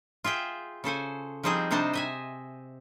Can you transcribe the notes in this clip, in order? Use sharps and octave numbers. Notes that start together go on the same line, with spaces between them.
F4 G#4 E5 G5
C#3 A4 C5 G#5
F3 G3 C4 D#4 G#4 G5
C3 G3 D4 D#4 C5 A5
D#5 E5 G#5